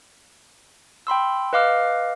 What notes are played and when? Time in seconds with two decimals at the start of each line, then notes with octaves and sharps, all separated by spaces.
1.07 G5 B5 C6 E6
1.53 B4 D#5 F5 D6 F6